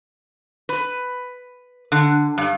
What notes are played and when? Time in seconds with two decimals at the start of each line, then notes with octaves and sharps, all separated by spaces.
0.69 B4
1.92 D3
2.38 G2